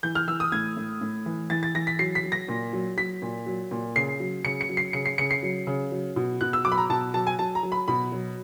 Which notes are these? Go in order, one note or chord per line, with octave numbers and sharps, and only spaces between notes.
E3 G6
F6
E3 E6
D#6
A2 G#6
A2
A2
E3
E3 A6
A6
E3 A#6
B6
F#3 C7
B6
F#3
A#6
A#2
F#3
F#3 B6
A#2
F#3
A#2
C#3 C7
F#3
C#3 C#7
C#7
F#3
C7
C#3 C#7
C7
C#3 C#7
C7
F#3
C#3
F#3
B2
B2 F#6
E6
F#3 D6
B5
A#5
B2 A5
F#3 A5
G#5
F#3 A5
A#5
F#3
B5
B2 B5
F#3